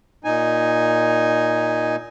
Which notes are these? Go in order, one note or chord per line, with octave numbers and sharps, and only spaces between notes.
A#2 D#4 G#5